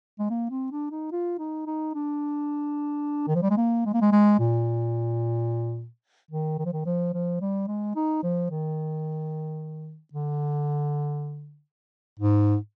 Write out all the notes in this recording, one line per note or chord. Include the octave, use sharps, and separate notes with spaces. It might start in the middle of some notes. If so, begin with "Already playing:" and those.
G#3
A#3
C4
D4
D#4
F4
D#4
D#4
D4
D#3
F3
G3
G#3
A#3
G#3
A#3
G#3
G#3
A#2
D#3
D#3
F3
D#3
F3
F3
G3
G#3
D#4
F3
D#3
D3
G#2